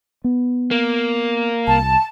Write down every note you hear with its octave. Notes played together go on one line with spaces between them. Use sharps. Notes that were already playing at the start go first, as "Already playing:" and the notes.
B3
A#3
C2 A5